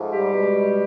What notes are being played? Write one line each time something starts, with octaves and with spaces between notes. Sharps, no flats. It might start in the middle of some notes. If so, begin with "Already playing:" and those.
Already playing: G#2 F3 A3
G3 G4
B2 G#3